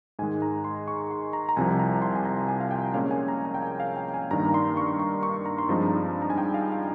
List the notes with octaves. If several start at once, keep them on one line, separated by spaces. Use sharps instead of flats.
G#2 D#3 G#3 G#5
A#5
C6
C#6
C6
A#5
A#5
C2 C3 F3 G#5
A#5
C6
G#5
A#5
G#5
F5
G5
A#2 G#3 C#4 F5
G#5
A#5
A#5
G5
G#5
F5
G5
G#5
G2 D#3 A#3 A#5
A#5
C6
C#6
C#6
C#6
A#5
C6
G2 F3 G#3 C4 D#4 A#5
A#5
G#5
G5
F5
F5